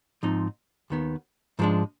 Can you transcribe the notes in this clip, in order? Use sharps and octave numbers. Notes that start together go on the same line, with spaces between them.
G#2 F3 C4 D#4
D#2 D#3 B3
G#2 F3 G#3 D4